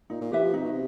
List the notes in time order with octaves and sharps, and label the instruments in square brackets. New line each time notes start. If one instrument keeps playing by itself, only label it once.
[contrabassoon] A#2 [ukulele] D#4
[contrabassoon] A#2
[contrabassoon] E3 [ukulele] G4 B4 E5
[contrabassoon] F3
[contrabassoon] C3 [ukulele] D#4
[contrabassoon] B2
C3